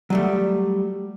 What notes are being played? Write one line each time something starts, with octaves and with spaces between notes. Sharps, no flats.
F#3 G3 A3